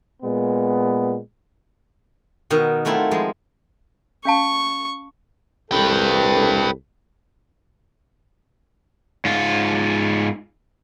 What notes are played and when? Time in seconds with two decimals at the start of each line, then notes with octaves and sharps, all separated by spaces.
0.23 A#2 G#3 B3
2.50 B2 D#3
2.85 F#3 A3 C4 E4 F4
3.11 F3 G#3
4.25 C#4 F5 A5 C#6
5.71 C2 A4 B4 G5
9.25 G#2 F4